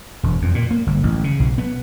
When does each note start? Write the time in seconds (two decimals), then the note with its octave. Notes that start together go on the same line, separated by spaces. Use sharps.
0.23 E1
0.42 F2
0.54 A#2
0.71 A#3
0.87 G1
1.03 A1
1.24 C#3
1.40 B1
1.58 B3